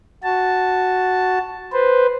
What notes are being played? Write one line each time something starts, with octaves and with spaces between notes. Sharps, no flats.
F#4 A5
B4 C5